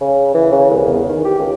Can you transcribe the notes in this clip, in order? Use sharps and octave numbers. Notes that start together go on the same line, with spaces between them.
C#3
E3
C#3
C2
E2
D#3
G4
C#2